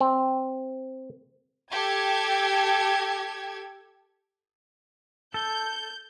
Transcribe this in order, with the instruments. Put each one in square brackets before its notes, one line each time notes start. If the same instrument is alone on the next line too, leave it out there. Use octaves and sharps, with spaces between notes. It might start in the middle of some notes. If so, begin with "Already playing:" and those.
[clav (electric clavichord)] C4
[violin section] G4 A4 G#6
[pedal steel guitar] A4 [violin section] G6